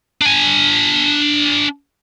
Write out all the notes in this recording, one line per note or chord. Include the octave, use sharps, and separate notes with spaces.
D4 G#5